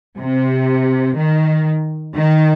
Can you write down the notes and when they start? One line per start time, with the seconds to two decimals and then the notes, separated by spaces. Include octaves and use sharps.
0.17 C3
1.16 D#3
2.15 D#3